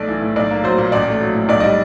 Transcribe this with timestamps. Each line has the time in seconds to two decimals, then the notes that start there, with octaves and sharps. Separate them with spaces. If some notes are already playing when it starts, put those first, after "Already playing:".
Already playing: B1 A3 D5
0.08 E3
0.21 A2
0.36 B1 D5
0.51 A#3
0.64 F#3 C5
0.78 A#2
0.92 A1 D5
1.07 A3
1.21 F#3
1.35 A2
1.49 B1 D5
1.60 G3 D#5